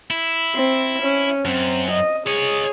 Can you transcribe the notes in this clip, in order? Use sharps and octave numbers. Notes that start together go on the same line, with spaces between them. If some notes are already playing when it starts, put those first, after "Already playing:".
E4
C4
C#4
F#2 C4
D#5
G#4 C#5 D#5